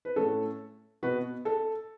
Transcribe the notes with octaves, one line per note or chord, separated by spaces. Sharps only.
B4
A2 A3 C#4 A4
B2 B3 F#4 B4
A4